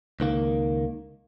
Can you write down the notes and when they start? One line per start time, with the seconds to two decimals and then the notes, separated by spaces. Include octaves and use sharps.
0.20 C#2 D#3 A#3